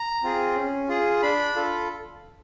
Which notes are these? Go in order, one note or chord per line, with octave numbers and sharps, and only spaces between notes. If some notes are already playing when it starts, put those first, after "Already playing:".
Already playing: A#5
C4 F4 G#4
C#4
F4 G#4
D4 B5
F4 A4